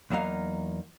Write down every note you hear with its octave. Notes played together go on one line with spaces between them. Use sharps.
E2 F#3 A#3 D#4 F5